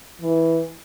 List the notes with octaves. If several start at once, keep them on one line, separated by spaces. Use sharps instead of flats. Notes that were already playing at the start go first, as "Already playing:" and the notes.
E3